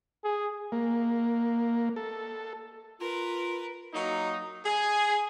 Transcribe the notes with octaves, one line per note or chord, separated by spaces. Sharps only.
G#4
A#3
A4
F4 A#4 B4
F#3 A#3 D#4
G#4